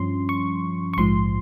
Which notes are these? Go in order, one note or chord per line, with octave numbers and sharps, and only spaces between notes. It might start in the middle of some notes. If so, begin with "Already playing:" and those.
Already playing: G2 F3 C#4 C6
C#6
C#6
A#1 G#2 F3 C6